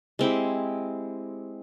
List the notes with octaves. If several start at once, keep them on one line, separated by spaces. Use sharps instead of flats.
G#3 C4 E4 G4